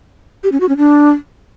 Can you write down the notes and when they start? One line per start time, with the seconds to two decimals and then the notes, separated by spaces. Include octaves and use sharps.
0.44 G4
0.52 C#4
0.60 F#4
0.69 C#4
0.77 D4